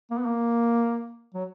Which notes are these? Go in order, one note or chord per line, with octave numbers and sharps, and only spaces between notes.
A#3
B3
A#3
F#3